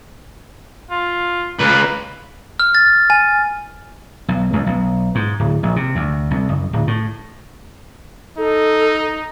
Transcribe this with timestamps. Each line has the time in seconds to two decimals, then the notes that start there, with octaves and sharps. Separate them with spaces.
0.91 F4
1.60 C#2 A#3 B4
2.60 F6
2.75 A6
3.10 G#5
4.28 B1
4.53 C#2
4.66 B1
5.15 G#2
5.40 D1
5.63 A#1
5.76 C3
5.95 D2
6.31 C2
6.49 F#1
6.73 D1
6.87 A2
8.38 D#4 A4